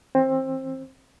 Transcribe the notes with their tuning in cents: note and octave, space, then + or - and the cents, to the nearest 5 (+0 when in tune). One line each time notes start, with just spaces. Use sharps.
E3 -15 C4 +20